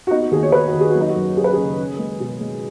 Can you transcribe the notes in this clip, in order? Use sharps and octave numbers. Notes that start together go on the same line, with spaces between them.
F#4
B3 D#4
F#4
D#2 G#4
C#5
D#2 B4
F#4
D#2
G#4
F#4
F#3
D#4
F#4
F#2
C#4 G#4
B4
C#3 G#4
C#4
G#3
B2
G#3